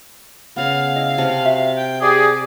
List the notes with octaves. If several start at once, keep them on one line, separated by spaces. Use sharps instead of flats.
C#3 B3 F5
E4 D#5
C3 A5
F#4 E5
G5
G4 G#4 D5